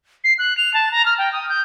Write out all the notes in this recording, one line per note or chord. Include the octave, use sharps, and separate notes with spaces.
C7
F#6
F7
A5
A#5
F6
G5
D#6
G6